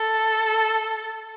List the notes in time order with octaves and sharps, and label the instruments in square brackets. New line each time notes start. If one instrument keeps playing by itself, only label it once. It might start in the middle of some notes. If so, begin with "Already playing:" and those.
Already playing: [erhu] A4